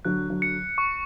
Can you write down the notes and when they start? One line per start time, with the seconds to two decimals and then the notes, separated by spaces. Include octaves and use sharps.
0.05 D3 F#3 F#6
0.30 D3 F#3
0.42 C#7
0.78 C#6